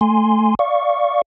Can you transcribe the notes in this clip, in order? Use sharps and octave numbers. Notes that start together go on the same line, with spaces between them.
A3 G#5 C6
D5 F5 C#6